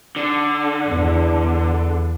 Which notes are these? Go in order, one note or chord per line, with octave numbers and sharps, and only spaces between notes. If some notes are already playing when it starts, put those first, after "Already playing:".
D3
E2